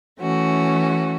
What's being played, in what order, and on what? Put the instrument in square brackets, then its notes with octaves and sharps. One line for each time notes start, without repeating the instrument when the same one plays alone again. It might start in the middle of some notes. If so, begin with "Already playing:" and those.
[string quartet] E3 A3 C#4 F#4